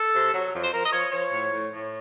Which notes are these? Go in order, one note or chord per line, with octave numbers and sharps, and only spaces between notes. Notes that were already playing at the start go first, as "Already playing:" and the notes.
Already playing: A4
C3
F#3
F2
C5
F3 A#4
D#5
F3 C#5
F3 C#5
A2
A2
A2